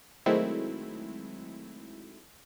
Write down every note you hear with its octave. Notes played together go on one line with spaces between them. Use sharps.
D#3 F#3 G#3 A3 C4 E4